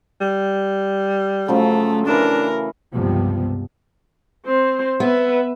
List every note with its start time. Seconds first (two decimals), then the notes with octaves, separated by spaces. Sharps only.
0.21 G3
1.48 C#3 F3 F#3 A3
2.07 E3 A3 D4 A#4
2.92 C#2 G2 C3 F3 B3
4.46 C4 C5
5.00 B3 B4 E5